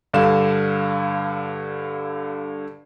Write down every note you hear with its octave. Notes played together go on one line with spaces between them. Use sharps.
G2 D3 F5 E7